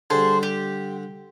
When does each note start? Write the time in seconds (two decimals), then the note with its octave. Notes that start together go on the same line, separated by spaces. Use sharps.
0.10 D3 G3 G#4 C5 A5
0.43 G4